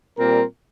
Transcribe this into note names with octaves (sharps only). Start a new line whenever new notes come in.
A#2 G3 C4 A#4